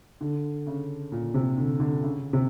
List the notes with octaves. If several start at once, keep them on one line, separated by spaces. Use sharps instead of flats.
D3
C#3
A#2
C3
D3
D3
C#3
C3